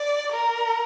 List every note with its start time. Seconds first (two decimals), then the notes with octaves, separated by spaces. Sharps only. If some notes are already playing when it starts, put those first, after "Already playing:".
Already playing: D5
0.32 A#4